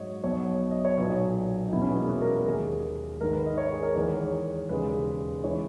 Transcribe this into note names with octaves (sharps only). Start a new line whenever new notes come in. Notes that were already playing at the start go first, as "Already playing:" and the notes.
Already playing: G#2 F#3 C#5 D#5
B1 B2 F#3 C#5
D#5
C#5
B1 A#2 F#3 B4
D#4
E1 E2 B2 F#3 E4
C#4
B3
G#3
A#3
F#4
A#4
A#4
D#2 D#3 G#3 G#4
G#1 G#2 D#3 A#4
B4
D#5
C#5
G#4
A#4
E2 D#3 G#3 C#5
E1 D#2 C#3 G#3 B4
C#3 E3 G#3 C#5